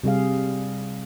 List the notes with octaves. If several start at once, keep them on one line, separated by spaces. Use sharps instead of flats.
C3 G3 G#4 F5